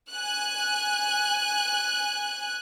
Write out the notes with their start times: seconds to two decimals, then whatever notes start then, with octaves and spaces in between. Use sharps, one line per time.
0.12 G#5 F#6